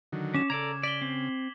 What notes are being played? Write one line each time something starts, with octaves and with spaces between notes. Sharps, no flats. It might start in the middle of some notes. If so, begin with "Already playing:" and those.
D3 D#3 F#3
C#4 D6 E7
C#3 A4 D5 A#5 D6 G#6
D5 B6 F#7 G7
C4